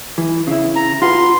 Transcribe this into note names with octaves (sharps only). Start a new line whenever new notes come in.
E3
C#3 E4
A#5
F4 F#4 B4 C6